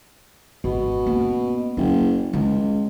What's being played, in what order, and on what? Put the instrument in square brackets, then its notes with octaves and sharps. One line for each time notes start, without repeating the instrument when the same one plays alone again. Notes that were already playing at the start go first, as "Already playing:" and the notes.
[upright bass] G#1 [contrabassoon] B2
[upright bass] A#3 C#4
[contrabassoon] F#1 [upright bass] F#3
[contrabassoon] C#2 [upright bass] G#3